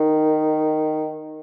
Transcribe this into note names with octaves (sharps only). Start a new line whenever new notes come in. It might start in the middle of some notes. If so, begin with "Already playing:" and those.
Already playing: D#3